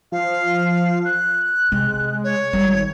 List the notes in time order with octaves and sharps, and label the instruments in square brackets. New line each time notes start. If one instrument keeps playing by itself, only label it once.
[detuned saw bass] F3 [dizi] F5
[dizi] F#6
[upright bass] C3 [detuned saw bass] G#3
[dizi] C#5
[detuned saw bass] G#1 [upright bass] G3 G#3